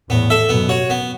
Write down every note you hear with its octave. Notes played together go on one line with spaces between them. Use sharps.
E2 A2 B3
A4 E5
F#2 B2 B3
F#4 C#5
B3